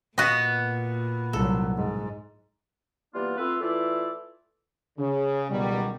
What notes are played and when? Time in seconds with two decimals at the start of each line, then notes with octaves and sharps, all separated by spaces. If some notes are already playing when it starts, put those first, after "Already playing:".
0.18 A#2 B3 F#4 D#5
1.33 C2 F#3 A4
1.76 G#2
3.14 E3 G3 A#3 B3 D4 F4
3.37 A3 B3 C4 F4 B4 E5
3.61 E3 A3 E4 F4 D5 E5
4.99 C#3
5.50 C#2 B2 D#3 F#3 G3